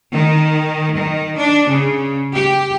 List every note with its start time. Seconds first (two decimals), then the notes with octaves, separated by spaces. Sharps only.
0.12 D#3
0.95 D#3
1.37 D4
1.69 C#3
2.32 G4